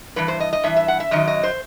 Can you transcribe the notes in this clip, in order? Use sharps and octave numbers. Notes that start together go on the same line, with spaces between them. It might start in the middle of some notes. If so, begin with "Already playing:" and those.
G2 E3 B4
C5
D#5
D#5
G2 E3 E5
E5
F#5
E5
F#2 D#3 F#3 D#5
D#5
C5